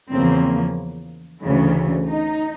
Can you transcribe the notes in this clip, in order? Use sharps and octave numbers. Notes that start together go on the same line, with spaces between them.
E2 C#3 F3 A#3 C4
D2 C#3 E3
D#4